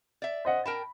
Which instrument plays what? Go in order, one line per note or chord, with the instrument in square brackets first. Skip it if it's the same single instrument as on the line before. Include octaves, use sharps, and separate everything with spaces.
[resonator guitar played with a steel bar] D5 E5
[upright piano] C5 D#5 F#5
[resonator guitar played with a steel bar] A#4 G5 A5 [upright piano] B5